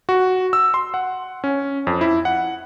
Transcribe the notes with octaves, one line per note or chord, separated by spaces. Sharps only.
F#4
E6
C6
F#5
C#4
F2
E4
F#5